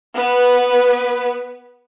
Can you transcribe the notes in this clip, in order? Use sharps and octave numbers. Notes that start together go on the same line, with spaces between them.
B3 B4